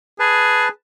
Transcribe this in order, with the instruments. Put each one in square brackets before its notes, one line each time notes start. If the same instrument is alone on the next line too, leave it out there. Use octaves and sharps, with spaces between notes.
[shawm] G#4 [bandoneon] B4 A5